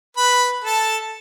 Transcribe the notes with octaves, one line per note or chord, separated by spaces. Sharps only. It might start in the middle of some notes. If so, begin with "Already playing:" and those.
B4 B5
A4 A5